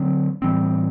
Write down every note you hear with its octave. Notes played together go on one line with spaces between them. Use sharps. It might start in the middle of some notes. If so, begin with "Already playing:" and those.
Already playing: D3 F#3 C4
A2 E3 G3 C4